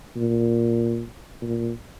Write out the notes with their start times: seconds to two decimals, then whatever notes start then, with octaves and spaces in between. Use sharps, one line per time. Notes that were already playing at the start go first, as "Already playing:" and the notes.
0.16 A#2
1.42 A#2